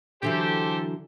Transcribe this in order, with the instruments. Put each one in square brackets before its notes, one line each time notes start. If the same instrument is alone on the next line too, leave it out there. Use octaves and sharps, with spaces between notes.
[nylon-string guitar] D3 E3 F#3 [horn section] G4 A4 C5